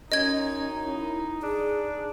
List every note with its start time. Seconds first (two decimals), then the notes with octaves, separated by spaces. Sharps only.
0.12 F#2 C#4 D#4 D#5 G#6
0.84 E4
1.43 D4 G#4